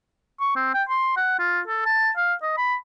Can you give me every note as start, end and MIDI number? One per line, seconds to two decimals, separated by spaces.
0.40 0.52 85
0.56 0.70 60
0.74 0.83 79
0.89 1.15 84
1.17 1.36 78
1.39 1.60 65
1.67 1.83 69
1.85 2.10 81
2.17 2.34 77
2.42 2.54 75
2.58 2.75 83